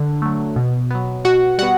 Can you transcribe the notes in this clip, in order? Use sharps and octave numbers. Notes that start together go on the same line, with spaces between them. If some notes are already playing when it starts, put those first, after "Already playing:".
Already playing: D3
F#3 A3
B2
F#3 B3
B2 F#4 F#5
G3 B3 F#4 F#5